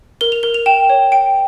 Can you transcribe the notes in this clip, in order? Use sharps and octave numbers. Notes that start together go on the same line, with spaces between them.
A#4 G7
F7
A#4 G7
F7
G5 E7
C#5
G5 D7